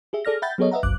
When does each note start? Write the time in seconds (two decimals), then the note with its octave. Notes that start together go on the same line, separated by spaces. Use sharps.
0.13 G4 G#4 E5
0.25 G#4 A4 D5 F6 A#6
0.42 E5 F#5 G5 B5 G6 A6
0.58 F#3 B3 G#4 A4 C#5 D#5
0.71 B4 D#5 E5 F#5 A#5
0.83 G1 C2 F#2 D6 F#6